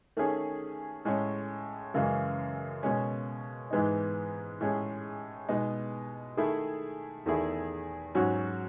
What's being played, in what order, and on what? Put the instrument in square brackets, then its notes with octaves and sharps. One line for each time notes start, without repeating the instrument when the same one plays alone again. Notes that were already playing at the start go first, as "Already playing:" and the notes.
[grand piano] D#3 A3 C#4 G#4
A2 G#3 C#4
F#2 C#3 E3 G#3
B2 G#3 C#4
G#2 E3 G#3 B3 D#4
A2 G#3 C#4 G#4
B2 G#3 B3 D#4
D#3 A3 E4 G#4
E2 D#3 A3 E4 G#4
G#2 F#3 C#4 F#4